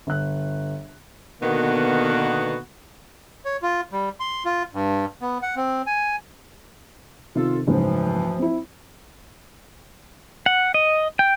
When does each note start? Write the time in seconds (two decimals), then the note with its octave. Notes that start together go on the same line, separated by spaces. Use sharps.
0.07 G1 F#6
1.42 B2 D3 D#3 A#3 B3 F#4
3.45 C#5
3.62 F4
3.92 G3
4.20 C6
4.45 F4
4.74 G2
5.21 B3
5.42 F#5
5.56 C4
5.87 G#5
7.35 C3 D#3 F4 A4
7.67 F#1 D2 G#2 E3 F3
8.39 C4 E4
10.46 F#5
10.74 D#5
11.19 G5